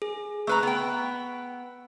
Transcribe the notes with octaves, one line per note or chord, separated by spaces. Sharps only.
G#4
A3 B4 A#5 E6
B3 G5